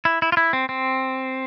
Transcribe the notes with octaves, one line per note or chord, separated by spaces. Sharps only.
E4
E4
F4
E4
C4
C4